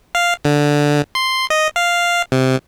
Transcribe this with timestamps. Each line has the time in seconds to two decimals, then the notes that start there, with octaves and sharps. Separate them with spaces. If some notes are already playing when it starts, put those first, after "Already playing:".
0.15 F5
0.45 D3
1.15 C6
1.50 D#5
1.76 F5
2.32 C3